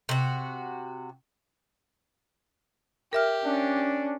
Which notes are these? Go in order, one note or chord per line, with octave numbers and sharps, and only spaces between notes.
C3 F#4
G4 A#4 E5 F6
C#4 D4